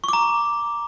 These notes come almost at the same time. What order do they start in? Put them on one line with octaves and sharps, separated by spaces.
C#6 D6 A#5